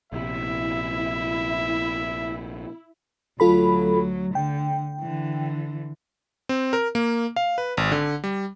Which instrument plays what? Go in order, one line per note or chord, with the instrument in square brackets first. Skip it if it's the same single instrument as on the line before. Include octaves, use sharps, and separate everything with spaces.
[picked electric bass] A#1 C3 [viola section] E4 [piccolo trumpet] E5
[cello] D2 F#3 [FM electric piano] F4 A4 B5
[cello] D3 [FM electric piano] G5
[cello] D3 E3
[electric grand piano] C4
A#4
A#3
F5
B4
G#1
D3
G3